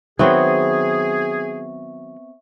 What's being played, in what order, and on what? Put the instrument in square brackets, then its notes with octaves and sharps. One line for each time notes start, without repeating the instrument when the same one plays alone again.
[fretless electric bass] D#3 F#3 [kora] B3 C4 [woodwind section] G#4 [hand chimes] E5 C#6